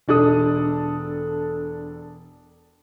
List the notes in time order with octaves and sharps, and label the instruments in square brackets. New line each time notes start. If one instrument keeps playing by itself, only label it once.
[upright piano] E1 D4 A4 D#6